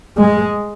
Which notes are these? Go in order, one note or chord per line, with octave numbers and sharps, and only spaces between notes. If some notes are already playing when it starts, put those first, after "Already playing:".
G#3